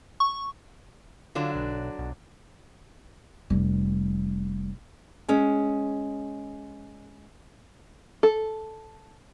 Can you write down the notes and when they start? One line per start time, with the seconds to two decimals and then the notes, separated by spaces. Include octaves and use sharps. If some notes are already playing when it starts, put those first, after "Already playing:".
0.20 C#6
1.35 D3 F#3 D4 F4
1.55 B1
1.99 B1
3.50 F1 G3
5.28 G#3 C#4
8.23 A4